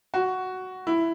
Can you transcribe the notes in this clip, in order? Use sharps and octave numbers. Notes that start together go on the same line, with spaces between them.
F#4
E4